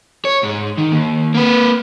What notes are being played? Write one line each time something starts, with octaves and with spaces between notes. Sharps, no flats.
C#5
G#2
D#3
D#2
A#3 B4